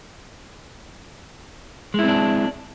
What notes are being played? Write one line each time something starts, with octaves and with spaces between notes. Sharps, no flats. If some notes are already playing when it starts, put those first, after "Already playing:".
G#3 C4 D4 E4